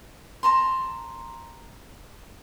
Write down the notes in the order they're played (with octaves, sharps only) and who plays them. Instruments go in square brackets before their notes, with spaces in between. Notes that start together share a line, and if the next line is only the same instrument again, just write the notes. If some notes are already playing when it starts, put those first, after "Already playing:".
[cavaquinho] A5 A#5 C6